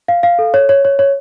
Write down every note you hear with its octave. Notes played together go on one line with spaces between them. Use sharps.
F5
F5
A4
C#5
C#5
C#5
C#5